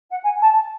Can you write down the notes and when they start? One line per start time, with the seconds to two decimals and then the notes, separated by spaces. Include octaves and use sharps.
0.10 F#5
0.23 G#5
0.41 A5